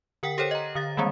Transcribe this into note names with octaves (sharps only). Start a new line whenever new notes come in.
D3 A#4 F#5 G5 B6
G4 A4 C5 C#5 G5
D#5 A#5
D3 F5 A6
D#3 G3 G#3 A#3 C4